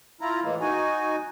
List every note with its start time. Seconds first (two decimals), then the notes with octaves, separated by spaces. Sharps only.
0.21 E4 F4 A#5
0.43 A2 E3 G#3 A#3
0.61 D#4 F#4 G#5